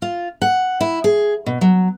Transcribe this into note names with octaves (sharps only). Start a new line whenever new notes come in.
F4
F#5
E4
G#4
B2
F#3